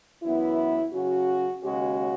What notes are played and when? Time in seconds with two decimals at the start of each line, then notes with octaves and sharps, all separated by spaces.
0.23 F#2 E3 B3 E4
0.93 C#3 F#3 C#4 F#4
1.63 D#2 C#3 G#3 C#4 F#4